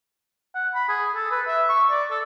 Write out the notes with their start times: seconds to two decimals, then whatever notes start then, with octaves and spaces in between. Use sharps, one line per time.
0.55 F#5
0.75 B5
0.89 G#4
1.15 A4
1.31 B4
1.47 E5
1.69 C#6
1.91 D5
2.11 A4